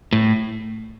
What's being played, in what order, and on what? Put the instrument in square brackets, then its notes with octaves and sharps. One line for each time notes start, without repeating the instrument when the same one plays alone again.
[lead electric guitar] A2